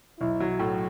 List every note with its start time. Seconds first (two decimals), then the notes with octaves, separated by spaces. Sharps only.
0.20 B1 E4
0.40 F#3
0.59 A2